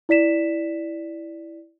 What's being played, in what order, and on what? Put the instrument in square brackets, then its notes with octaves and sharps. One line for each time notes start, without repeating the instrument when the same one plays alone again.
[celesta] E4 D5 B6 E7